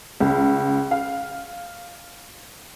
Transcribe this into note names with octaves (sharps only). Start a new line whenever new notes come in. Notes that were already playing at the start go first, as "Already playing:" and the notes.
C#2
F5